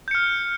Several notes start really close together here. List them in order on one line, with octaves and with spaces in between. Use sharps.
G6 C#7 F6